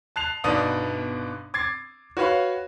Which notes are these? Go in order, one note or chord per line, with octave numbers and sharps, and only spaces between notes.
A5 F#6 C7 F7
G1 B2 B3 D4 D#4 D#6
D6 G#6 A6 C7
F#4 B4 C#5 F5 B5